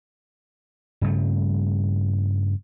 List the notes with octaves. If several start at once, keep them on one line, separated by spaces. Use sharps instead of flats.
G2 C#3 G3 A3